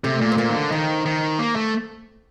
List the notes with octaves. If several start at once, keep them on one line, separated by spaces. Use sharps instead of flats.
C3 A3
A#2
C4
A#2 A#3
D#3
D3
D#3 C4
D#3
A#3
A3